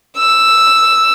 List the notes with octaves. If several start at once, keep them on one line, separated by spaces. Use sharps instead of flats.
E6